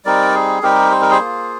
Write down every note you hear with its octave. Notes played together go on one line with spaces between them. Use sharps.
G3 C4 D#4 A#4 D5
G#4
G3 C4 D#4 G4 A#4
C5
A#4
G#4 C5
A#3 F4